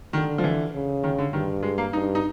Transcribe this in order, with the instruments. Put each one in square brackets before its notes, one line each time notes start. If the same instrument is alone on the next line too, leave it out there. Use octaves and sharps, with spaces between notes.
[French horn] D3 [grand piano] D#3
[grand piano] F3
E3
[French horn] C#3
[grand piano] D#3
D3
[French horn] G2 [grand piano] D#3
[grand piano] G#3
A#3
[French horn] G2 [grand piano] D#4
[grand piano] D#4